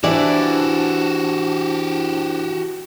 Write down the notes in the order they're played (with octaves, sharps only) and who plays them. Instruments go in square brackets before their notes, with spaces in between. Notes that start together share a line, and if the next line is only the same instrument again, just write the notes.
[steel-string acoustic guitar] E3 E4 D5 [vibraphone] D4 C5 A5 [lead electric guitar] F#4 G4